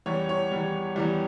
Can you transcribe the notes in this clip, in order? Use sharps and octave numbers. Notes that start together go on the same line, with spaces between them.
E2 E3 G3 C#5
C#5
E2 E3 G3
E2 E3 G3